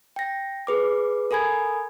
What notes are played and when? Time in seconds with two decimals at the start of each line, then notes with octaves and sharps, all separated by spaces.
0.16 G5 A#6
0.67 G#4 B4 D6
1.31 A4 A#4 G#5 B5 G#6